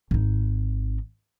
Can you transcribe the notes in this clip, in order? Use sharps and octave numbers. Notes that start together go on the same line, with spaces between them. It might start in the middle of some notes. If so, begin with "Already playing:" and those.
G#1 D#4